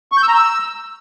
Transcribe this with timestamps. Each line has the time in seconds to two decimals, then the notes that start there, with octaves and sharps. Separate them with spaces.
0.12 C#6
0.17 G6
0.23 E6
0.28 A#5
0.34 E6